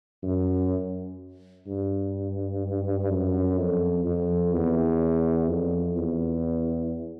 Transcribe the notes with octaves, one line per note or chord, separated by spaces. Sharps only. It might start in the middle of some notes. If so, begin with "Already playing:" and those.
F#2
G2
F#2
F2
F2
E2
F2
E2